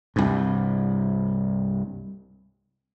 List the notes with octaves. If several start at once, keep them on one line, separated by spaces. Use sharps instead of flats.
C2 G2